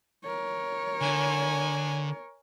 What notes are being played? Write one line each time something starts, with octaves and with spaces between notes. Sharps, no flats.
A#4 C#5
D3 G#5